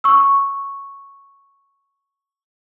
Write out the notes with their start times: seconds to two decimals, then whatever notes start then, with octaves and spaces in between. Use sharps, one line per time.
0.04 C#6 E6